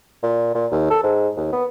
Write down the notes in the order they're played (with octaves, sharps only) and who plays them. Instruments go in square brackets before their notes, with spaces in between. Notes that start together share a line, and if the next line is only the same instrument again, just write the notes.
[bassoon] A#2
A#2
D#2
A4
G#2
D#2
B3